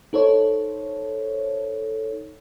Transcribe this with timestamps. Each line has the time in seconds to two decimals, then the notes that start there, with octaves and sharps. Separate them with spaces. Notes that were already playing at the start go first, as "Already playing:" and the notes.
0.13 D#4 A4 C5 C#5